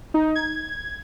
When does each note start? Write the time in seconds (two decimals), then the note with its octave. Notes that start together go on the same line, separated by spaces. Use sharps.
0.14 D#4
0.35 G#6